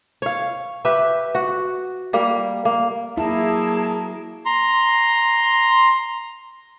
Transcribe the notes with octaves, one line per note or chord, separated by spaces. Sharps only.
C#5 F5
G4 B4 E5
F#4
G3 A#3
A#3
F#3 A#3 E4 G#4 A5
A#5 C6